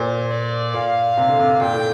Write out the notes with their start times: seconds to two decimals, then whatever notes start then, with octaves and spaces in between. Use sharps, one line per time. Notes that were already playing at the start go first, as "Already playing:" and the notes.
Already playing: A#2 C5
0.30 D5
0.74 A#2 F5
1.17 C3
1.29 D3
1.39 C3
1.61 A#2 G5
1.72 A2